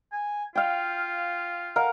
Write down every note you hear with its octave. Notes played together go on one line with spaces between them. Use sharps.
G#5
F4 F5 G5
A#4 F5 F#5